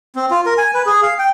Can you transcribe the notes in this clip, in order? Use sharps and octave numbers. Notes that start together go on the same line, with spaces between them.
C4
F4
A#4
G#5
B4
G#4
F5
G5